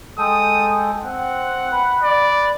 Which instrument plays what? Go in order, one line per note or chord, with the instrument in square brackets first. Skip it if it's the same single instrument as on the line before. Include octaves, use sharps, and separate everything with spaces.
[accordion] G#3 A4 G5 [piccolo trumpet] D#6
[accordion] C4 [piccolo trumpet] F#5
[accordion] B4
[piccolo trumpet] D5